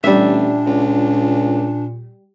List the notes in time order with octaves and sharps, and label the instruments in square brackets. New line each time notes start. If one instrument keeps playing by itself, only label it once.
[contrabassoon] A1 [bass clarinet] A#2 [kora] G3 E5 [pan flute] D4
[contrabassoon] C#2